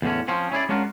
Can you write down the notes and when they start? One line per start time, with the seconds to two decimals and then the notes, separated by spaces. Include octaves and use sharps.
0.02 E2 A2 D3 C#4
0.28 F3 C4 C#4
0.52 C#4 E4 G#4 D5
0.69 G#3 C#4 D4 F4 F#4 A#4